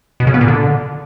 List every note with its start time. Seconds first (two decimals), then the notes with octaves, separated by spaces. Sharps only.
0.20 B2
0.27 C#3
0.34 B3
0.41 A#2
0.48 D3